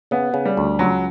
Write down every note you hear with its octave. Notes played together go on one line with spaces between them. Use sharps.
C#3 B3
C#3
G3
D2
C#2 F#3